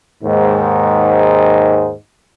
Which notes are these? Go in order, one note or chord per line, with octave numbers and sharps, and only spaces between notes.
D#2 G#2